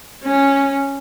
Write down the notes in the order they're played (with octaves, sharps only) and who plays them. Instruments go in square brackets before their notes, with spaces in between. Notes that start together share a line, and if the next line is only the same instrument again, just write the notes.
[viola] C#4